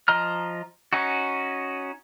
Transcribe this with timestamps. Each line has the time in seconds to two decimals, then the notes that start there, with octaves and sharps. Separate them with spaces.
0.08 F3 D#5 A#5 F6
0.93 C#4 D#4 F#4